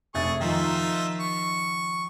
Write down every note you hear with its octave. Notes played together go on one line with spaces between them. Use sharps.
F1 G#4 E5 C#6 A6
D#3 F3 D#4 F4 E5
C#6